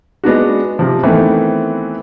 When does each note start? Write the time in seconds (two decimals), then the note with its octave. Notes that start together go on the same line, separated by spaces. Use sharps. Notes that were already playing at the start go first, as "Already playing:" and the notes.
0.24 G#3 B3 D4 F#4
0.79 C3 F3
1.03 D#3 E3 A3 B3 C4